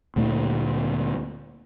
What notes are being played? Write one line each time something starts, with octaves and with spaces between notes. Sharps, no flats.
D2 A#2 A3